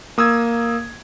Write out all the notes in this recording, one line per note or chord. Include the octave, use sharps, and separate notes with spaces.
A#3 D#6 E6 G#6